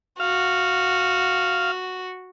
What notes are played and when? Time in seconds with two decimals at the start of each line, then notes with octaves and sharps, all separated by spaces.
0.20 F#4 F5